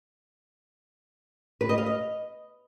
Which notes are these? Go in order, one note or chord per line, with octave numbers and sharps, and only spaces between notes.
B4
D#5
F5
D#5